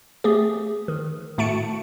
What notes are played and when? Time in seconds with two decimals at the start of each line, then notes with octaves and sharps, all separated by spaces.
0.24 A3 G4 G#4
0.88 D#3
1.38 A2 A3 F#4 A5 C#7 D7